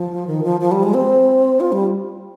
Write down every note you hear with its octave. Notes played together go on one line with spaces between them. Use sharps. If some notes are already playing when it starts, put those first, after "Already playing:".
Already playing: F3
D#3
F3
F3
G3
G#3
C4
F4
G3